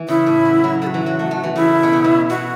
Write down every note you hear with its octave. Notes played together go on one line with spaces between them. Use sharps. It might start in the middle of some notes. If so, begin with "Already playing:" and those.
Already playing: E3
C#3 E4
A2
F#3
F#3
F#3 A4
F#4
E3
F#3
A3
A3
E3
C#3 E4
B2
C#3
B2
B2 F#4